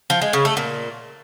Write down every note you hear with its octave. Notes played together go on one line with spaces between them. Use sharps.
F3
G#3
C#3
A3
A#2